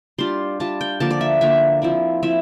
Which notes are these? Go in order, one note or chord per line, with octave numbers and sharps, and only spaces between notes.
G3 D4 F4 C6
G3 D4 F4 A5
G5
D3 F3 A#3 D4 A5
D5
E5
D3 F3 A#3 D4 E5
F3 C4 E4
F3 C4 E4 E5